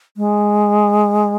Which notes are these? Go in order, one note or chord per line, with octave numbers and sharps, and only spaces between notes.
G#3